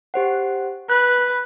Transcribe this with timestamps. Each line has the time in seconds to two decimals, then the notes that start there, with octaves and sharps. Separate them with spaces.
0.14 G4 C5 F#5
0.90 B4 F#6